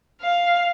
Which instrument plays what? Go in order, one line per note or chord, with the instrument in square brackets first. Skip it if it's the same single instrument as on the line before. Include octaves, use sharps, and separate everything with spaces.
[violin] F5